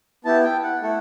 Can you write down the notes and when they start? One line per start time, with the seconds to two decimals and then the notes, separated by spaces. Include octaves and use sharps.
0.25 B3 E4 G4 A5
0.44 G5
0.63 F#5
0.82 A3 E4 A4